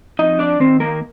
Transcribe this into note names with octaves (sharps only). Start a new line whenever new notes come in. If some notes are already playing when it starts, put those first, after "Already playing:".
F2 D#4 D#5
D4 D5
D#3 C4 C5
A#3 A#4